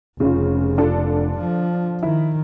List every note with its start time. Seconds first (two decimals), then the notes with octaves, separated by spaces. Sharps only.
0.20 F1 C#3 C#4 F4
0.78 D4 F4 A4
1.39 F3
2.03 D#3 E4